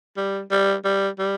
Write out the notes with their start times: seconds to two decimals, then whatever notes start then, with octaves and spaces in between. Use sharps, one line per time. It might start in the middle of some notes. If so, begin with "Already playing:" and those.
0.17 G3
0.51 G3
0.85 G3
1.19 G3